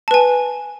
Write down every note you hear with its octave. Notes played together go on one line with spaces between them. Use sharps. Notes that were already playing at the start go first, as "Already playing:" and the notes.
B4 G#5 A5